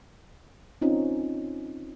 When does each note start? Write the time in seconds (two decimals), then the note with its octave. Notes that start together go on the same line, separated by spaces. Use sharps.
0.82 C4 C#4 D#4 F4